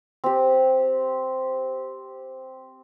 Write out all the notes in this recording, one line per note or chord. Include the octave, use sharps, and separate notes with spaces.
C4 G4